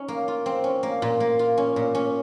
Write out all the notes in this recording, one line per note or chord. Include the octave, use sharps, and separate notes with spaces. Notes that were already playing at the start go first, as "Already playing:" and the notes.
Already playing: C#4 D#4
A#3
F4
C4
C#4
A#3
A#2
A#3
F4
C#4
A#2
C#4